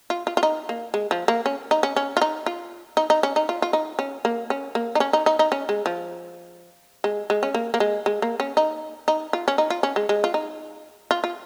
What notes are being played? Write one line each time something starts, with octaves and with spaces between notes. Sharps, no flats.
F4
F4
F4
D#4
A#3
G#3
F3
A#3
C#4
D#4
C#4
C#4
F4
D#4
F4
D#4
D#4
C#4
D#4
F4
F4
D#4
C#4
A#3
C#4
A#3
D#4
C#4
D#4
D#4
D#4
C#4
G#3
F3
G#3
G#3
C#4
A#3
A#3
G#3
G#3
A#3
C#4
D#4
D#4
F4
C#4
D#4
F4
C#4
G#3
G#3
F4
D#4
F4
F4